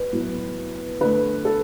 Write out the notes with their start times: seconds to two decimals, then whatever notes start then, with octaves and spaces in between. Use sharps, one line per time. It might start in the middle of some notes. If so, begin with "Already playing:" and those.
Already playing: B4
0.12 A2 F#3 B3
1.00 D3 A3 B4
1.45 A4